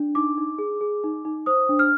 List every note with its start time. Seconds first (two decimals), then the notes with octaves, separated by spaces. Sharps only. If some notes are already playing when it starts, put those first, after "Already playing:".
Already playing: D4
0.15 D#4 D6
0.38 D#4
0.58 G#4
0.81 G#4
1.04 D#4
1.25 D#4
1.46 C5 D#6
1.69 D4
1.79 F6